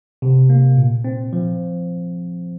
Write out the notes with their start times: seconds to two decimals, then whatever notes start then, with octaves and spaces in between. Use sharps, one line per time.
0.22 C3
0.50 A#3
0.77 A#2
1.04 C4
1.33 F3